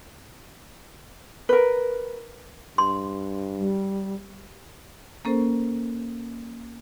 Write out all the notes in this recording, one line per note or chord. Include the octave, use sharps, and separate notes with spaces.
A#4 B4
G2 C6
G3
A#3 C#4 A4 A#4 C5